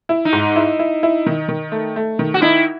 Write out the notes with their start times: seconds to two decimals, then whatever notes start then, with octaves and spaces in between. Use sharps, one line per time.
0.09 E4
0.25 D#4
0.33 G#2
0.56 E4
0.79 E4
1.03 E4
1.26 D#3
1.49 D#3
1.72 A3
1.96 A3
2.19 D#3
2.34 F#4
2.42 D#4 E4